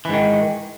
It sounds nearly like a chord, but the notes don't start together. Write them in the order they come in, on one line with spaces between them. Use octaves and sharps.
E3 G#2 D#3